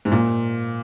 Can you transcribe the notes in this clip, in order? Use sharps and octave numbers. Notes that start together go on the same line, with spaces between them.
G#2
A#2